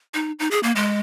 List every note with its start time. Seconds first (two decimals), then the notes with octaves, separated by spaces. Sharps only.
0.14 D#4
0.39 D#4
0.51 G#4
0.63 A#3
0.76 G#3